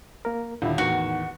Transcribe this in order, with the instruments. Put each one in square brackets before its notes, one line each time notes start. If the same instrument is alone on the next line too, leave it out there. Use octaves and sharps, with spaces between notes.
[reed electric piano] A#3 A#4
[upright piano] D#1 [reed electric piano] D3 E4
[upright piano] E2 D#3 [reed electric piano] A2 [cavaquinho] F#4